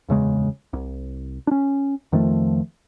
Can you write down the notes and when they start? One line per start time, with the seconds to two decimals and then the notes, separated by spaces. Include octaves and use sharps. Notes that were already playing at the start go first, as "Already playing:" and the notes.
0.09 D1 E2 C#3 G#3
0.73 C2
1.47 C#4 D4
2.12 F2 D#3 F3 A3